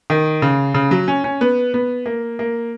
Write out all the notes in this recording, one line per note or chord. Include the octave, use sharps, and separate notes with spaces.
D#3
C#3
C#3
F#3
C#4
C#4
B3
B3
A#3
A#3